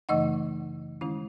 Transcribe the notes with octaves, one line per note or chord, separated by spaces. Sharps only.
F#2 C#3 E3 A3 D#4 D#5 F#5
D#3 G#3 C#4 E4